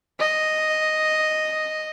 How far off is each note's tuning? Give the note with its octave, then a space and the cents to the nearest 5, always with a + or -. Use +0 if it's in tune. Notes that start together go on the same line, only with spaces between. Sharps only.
D#5 +0